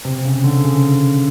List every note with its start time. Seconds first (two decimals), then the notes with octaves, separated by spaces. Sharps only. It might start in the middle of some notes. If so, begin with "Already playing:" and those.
0.05 C3
0.25 C#3
0.44 D3
0.65 C#3